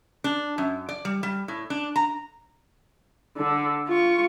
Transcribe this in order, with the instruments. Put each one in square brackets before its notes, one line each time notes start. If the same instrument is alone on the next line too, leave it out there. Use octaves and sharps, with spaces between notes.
[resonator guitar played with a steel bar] D4
F#2
D5
G3
G3
A2
D4
A#5
[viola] D3
F4 C#6